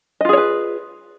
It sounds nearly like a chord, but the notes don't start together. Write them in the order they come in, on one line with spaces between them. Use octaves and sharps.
D#5 F4 G#4 C#5 B4